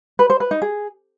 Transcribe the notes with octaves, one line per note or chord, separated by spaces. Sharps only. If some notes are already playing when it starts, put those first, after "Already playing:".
B4
C5
B4
D#4
G#4